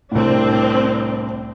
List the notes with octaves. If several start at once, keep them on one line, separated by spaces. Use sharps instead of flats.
C2 A2 C4 D4